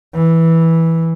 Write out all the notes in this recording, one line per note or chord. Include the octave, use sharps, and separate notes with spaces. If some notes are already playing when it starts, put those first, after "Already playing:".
E3